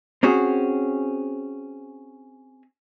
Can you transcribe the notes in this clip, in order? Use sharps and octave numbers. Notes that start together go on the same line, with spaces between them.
C4 C#4 F#4 G#4